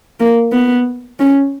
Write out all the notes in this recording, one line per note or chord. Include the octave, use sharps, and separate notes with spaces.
A#3
B3
C#4